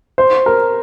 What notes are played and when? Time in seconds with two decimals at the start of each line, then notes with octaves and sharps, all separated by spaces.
0.18 C5
0.46 A#4